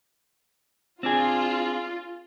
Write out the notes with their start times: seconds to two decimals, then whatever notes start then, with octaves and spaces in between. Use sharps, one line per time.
1.03 C4 D4 F4 G#4